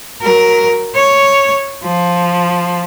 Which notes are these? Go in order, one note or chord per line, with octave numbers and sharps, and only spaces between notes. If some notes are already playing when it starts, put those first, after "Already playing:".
F#3 A#4
C#5
F3